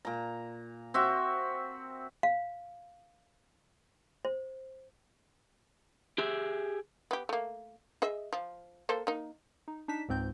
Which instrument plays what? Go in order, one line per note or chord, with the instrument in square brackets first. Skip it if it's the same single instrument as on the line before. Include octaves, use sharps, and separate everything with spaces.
[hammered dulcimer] A#2 A#5
C4 F#4 E5
[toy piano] F5
C5
[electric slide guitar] G4 G#4 E5
[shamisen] B3 G4
A3 A#3
G#4 D#5 E5
F3
A#3 A4 C5
A#3 D#4
[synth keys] D#4
D4 D#4 B6 E7
C#2 G#2 C4 G6